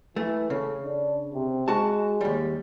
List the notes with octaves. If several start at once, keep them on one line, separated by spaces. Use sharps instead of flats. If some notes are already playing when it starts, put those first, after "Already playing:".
E3 A3
C#3 A4
D4
C3
G#3 F#4 A5
D#2 G3